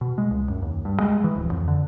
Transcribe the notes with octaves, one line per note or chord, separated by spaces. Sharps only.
B2
G#3
C#2
F#2
D#2
G2
G#3
E3
D1
F2
D3